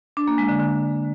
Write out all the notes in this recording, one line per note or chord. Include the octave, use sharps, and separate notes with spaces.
D4
A#3
G#3
D3
D3